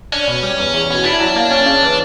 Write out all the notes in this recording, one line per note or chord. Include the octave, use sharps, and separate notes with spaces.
C#4 D4
B2
G3
E2
E2
B2
D4 E4
F#3
A#3
C#4
C#3
E3